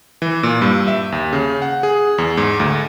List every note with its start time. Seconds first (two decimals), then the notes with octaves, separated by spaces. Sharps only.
0.22 E3
0.43 A#2
0.62 G2
0.88 E5
1.12 D#2
1.33 C#3
1.62 F#5
1.83 G#4
2.18 E2
2.37 G#2
2.60 D2